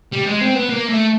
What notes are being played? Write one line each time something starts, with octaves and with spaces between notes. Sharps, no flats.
G3
G#3
C4
B3
A#3
A3